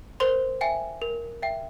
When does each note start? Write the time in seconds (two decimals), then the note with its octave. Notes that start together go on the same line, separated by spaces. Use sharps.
0.20 A#4 C5 C6
0.61 E5 G5 G#5
1.02 A#4
1.42 E5 G5